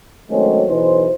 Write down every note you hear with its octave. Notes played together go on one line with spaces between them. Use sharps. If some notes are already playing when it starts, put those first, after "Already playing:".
D#3 F#3 G#3 A3 C4 C#4
B1 E3 D#4 C5